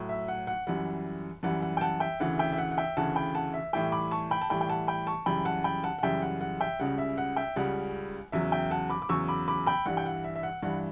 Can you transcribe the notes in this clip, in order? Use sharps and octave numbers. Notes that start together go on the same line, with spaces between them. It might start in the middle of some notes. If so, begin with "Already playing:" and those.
Already playing: A2 F#3
E5
F#5
F#5
F#2 E3 G3 F#5
F#2 E3 G3 F#5
F#5
G5
F#5 A5
E5 G5
D2 C#3 E3 F#5
E5 G5
E5
F#5
F#5
E5 G5
D2 C#3 E3 F#5 A5
G5 B5
F#5 A5
E5
A2 E3 G3 E5 G5
B5 D6
A5 C#6
G5 B5
A5
A2 E3 G3 G5 B5
G5
F#5 A5
G5 B5
A5 C#6
F#2 C#3 E3 G3 G5 B5
F#5 A5
G5 B5
F#5 A5
F#5
F#2 C#3 E3 G3 E5 G5
F#5
F#5
E5 G5
C#2 C#3 G3 F#5
E5
F#5
E5 G5
C#2 C#3 G3 F#5
E2 C#3 F#3 E5
E5 G5
F#5 A5
B5 D6
D6
E2 C#3 F#3 C#6 E6
B5 D6
B5 D6
G5 B5
G2 E3 G3 F#5
G5
F#5
E5
E5
F#5
G2 E3 G3 F#5